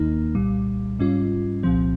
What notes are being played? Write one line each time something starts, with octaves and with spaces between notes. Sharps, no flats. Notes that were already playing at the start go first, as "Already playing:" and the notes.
Already playing: D#2 D#3 A#3 D#4
C2 A#2 G3
G#2 G3 C#4 F4
C2 A#2 F3 C4